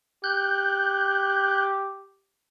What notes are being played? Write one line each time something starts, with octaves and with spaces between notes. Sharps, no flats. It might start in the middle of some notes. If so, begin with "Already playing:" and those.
G4 F#6 G6